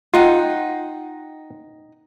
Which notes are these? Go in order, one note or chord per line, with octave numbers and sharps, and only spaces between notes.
D#4 F4 F#5 G5